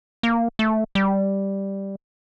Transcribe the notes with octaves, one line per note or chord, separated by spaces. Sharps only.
A#3
A3
G3